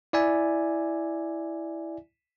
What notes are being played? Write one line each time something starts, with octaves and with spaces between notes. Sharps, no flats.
E4 D5 E5 G#5